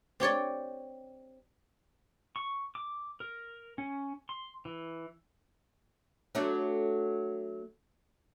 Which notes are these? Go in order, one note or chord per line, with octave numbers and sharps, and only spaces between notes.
C4 G4 C#5 D5
C#6
D6
A#4
C#4
C6
E3
F#3 A3 D4